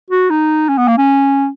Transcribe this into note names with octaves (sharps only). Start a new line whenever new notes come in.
F#4
D#4
C#4
B3
A#3
C#4